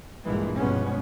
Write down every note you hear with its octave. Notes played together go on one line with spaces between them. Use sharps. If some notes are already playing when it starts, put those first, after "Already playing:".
A#1 G2 A#2 E3 G#3
G2 B2 F3 G#3 B3 C#4